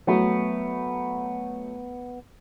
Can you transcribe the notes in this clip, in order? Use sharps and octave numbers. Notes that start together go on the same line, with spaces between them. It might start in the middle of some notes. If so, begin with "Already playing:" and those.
F#3 A3 B3